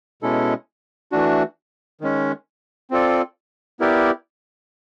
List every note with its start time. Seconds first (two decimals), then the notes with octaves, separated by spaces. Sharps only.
0.22 B2 G#3 C#4 E4 A4
1.12 E3 A3 D4 F#4
2.01 D#3 G#3 C#4
2.90 C4 F4 A4 D5
3.80 B3 E4 G4 A#4 D5